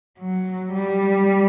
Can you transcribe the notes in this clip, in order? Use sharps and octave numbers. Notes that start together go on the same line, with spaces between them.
F#3
G3